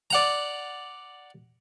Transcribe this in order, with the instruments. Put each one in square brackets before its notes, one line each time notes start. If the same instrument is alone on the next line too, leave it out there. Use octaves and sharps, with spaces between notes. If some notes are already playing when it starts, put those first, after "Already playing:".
[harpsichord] D5 F#5 A#5